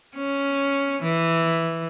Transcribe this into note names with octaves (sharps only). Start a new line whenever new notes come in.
C#4
E3